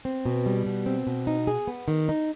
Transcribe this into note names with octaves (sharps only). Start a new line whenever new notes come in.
C4
B2
G3
B2
C4
B2
D#4
G#4
B3
D#3
D#4